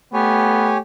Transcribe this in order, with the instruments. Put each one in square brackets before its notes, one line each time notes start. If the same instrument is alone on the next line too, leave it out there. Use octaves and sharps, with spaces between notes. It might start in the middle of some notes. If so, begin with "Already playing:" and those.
[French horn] A3 [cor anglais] B3 [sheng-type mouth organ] G4 C#5 G#5